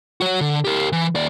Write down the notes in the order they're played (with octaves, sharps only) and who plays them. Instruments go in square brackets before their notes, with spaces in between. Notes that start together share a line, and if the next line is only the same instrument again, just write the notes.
[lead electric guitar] F#4 C#5
D3
G4 A#4
E3
D#2 D5